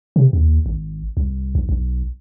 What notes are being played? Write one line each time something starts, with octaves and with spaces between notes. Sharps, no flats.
C3
D#2
G#1
C2
B1
B1